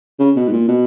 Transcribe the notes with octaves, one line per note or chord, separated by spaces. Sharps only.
C#3
B2
G#2
A#2
B2